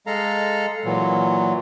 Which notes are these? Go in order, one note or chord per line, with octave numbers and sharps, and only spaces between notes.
G#3 A4 F5 A#5
A#2 E3 F#3